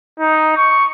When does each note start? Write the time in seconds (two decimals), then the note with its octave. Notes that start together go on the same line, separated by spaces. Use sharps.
0.20 D#4
0.57 C#6